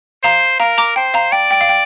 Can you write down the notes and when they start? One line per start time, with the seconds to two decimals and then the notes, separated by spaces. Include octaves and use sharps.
0.23 C5 F5 A#5
0.60 A#4 F5 A#5
0.78 A#5 D6
0.96 C5 G5
1.14 F5 A#5
1.32 D5 G5
1.51 G5
1.61 F5
1.69 G5